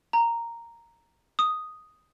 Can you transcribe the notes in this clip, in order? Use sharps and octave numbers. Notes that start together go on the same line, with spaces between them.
A#5
D#6